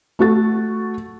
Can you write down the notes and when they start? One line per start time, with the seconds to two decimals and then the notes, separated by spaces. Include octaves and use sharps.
0.19 A3 F#4 A6